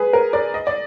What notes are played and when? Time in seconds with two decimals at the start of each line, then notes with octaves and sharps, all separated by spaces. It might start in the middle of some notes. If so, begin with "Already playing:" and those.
Already playing: G#4 B4
0.13 A#4
0.33 A#4 D5
0.54 D#5
0.67 D5